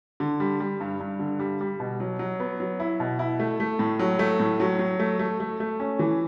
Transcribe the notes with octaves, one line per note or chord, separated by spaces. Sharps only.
D3
G3
G3
G2
G2
D3
G3
G3
B2
F#3
F#3
B3
F#3
E4
B2
E4
A3
A3
A2
F#3
A3
A2
F#3
F#3
A3
A3
A3
A3
C#4
E3